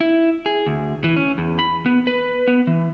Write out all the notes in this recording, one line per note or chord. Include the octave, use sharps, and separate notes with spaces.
E4
G#4
D2
E3
C#4
E2
B5
B3
B4
B3
E3